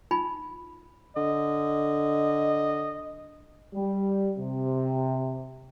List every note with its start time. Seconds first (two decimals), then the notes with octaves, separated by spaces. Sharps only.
0.11 D4 D#4 F4 G#5 B5
1.17 D3 D#5
3.75 G3
4.38 C3